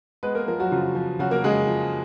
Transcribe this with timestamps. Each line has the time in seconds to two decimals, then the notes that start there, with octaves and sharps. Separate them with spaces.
0.23 G#3 B3 B4
0.35 A#3 A#4
0.47 F3 A#3 A#4
0.60 F#3 F#4
0.71 C#3 F3 F4
0.95 F3
1.19 C#3 F#3 F#4
1.31 A#3 A#4
1.44 C#3 G#3 G#4
1.67 F3